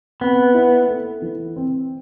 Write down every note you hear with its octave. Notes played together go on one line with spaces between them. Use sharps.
B3 C4
E4
A3
E3
C4